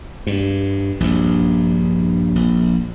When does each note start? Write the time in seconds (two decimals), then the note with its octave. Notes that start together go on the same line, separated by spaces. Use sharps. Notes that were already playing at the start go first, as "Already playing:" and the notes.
0.27 G2
1.00 A#1 G2
2.36 A#1